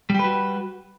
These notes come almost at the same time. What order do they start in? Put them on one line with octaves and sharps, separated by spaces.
G3 G4 B4 F#4